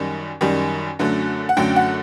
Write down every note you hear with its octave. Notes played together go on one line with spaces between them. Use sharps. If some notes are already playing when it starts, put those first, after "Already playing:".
Already playing: F#2 D#3 G3
F#2 D#3 G3
F#2 D3 F#3 A3
F#5
F#2 D3 F#3 A3 G5
F#5